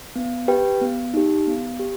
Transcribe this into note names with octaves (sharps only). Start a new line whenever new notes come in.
B3
G4 B4 G5
B3
D#4 G4
B3
G4